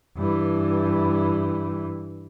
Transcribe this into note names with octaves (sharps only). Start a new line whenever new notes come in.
G2 E3